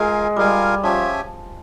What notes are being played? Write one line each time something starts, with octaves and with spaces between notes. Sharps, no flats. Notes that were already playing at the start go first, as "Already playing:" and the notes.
Already playing: G#3 F4 A#4 F5 G#5
G3 F4 A#4 F5 G#5
F3 C#4 G4 C#5 E5 G#5